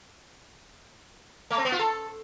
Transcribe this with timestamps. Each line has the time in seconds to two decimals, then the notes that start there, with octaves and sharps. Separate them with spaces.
1.50 A3
1.58 C4
1.65 B3
1.72 F4
1.79 A4